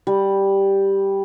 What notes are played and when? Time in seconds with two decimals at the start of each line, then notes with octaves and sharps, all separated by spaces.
0.07 G3